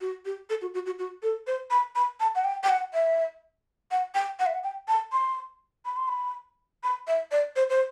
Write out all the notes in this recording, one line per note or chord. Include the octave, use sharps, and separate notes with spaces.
F#4
G4
A4
F#4
F#4
F#4
F#4
A4
C5
B5
B5
A5
F#5
G5
G5
F#5
E5
F#5
G5
F#5
E5
F#5
G5
A5
C6
B5
C6
B5
B5
E5
D5
C5
C5